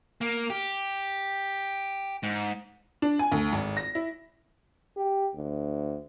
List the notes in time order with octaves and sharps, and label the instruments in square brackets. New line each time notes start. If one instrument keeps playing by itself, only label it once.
[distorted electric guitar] A#3
G4
G#2
[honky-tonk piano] D4
G#5
D2
G#1
A#6
E4
[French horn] G4
D2